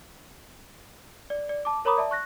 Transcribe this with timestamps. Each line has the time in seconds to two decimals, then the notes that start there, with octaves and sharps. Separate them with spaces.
1.30 D5
1.49 D5
1.65 A5 D6
1.85 A#4 C#5 A#5 B5 D6 D#6
1.97 D5 E5 A5
2.11 C#6 F#6 A#6